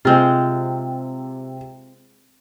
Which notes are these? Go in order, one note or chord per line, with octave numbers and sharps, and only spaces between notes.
C3 G#3 C4 F4